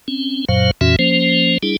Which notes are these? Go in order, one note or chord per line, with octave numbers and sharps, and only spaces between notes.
C4 C#4
F#2 A#2 F#3 C5 F5
F2 A#2 E3 C#4 F#4 E5
F3 A#3 C#4 C5
G3 D4 E4 G#4